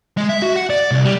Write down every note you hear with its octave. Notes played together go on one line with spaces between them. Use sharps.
G#3
E5
F#4
F#5
D5
C2
G3